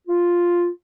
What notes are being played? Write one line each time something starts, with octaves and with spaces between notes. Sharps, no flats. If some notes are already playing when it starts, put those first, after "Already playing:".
F4